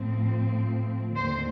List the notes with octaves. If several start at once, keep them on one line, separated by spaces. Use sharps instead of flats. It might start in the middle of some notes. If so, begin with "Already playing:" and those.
Already playing: A2 F3 C4
D#2 D3 A3 C4 C5